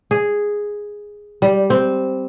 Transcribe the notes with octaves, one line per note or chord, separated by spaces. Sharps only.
G#4
G3
C4